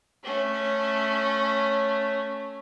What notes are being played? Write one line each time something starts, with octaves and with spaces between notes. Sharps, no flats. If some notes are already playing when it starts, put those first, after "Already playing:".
A3 C#4